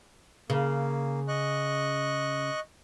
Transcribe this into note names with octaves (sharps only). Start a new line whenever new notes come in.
C#3 A#3
D#5 C#6 F#6